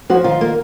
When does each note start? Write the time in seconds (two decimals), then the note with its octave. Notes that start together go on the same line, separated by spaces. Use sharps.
0.10 F3 F#4
0.24 D#3 F4
0.41 A#3